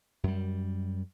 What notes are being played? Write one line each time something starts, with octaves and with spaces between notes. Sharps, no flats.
F#2 G3